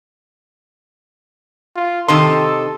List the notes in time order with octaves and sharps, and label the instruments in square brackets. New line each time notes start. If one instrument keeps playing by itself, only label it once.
[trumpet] F4
[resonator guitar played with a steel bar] C3 D#3 D#5 [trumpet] A4 [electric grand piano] C6